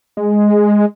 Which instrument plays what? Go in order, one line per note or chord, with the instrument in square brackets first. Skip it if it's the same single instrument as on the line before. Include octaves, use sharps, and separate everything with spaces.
[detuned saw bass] G#3